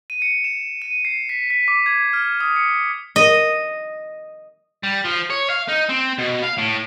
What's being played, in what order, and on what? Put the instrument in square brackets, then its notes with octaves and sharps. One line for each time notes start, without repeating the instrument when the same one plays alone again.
[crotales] D#7
C#7
E7
D#7
C7
B6
B6
D6
G#6
F6
D#6
C#7
[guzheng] D#5
[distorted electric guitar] G3
F3
C#5
F5
D#4
C4
B2
F5
A2